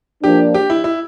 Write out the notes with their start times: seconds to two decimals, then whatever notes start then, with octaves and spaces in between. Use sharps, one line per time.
0.23 F3 A#3 D4 G4
0.54 G4
0.70 E4
0.84 E4